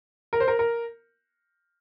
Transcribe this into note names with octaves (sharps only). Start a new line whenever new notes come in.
A#4
C5
A#4
A#4